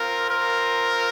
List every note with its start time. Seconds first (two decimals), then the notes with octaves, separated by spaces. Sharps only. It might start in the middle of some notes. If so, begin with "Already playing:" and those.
Already playing: C4 F4 A#4
0.31 A#4